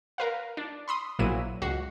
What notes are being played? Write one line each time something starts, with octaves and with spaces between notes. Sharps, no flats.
A#4 B4 F5
D4
B5 C6 D#6
A#1 A#2 F#3 E4 D#7
C#2 F#4 C7